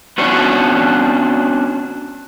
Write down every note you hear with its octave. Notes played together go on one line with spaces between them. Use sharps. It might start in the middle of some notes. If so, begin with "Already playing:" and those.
B3 C#4 D4 F#4 C#5